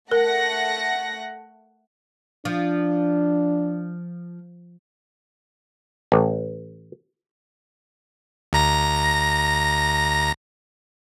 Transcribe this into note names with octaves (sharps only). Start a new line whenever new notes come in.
A3 A#4 F#5 A#6
F3 D4
A1
D2 A#5 A#6